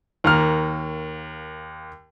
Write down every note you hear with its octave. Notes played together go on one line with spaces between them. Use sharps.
D#2 A#3 F6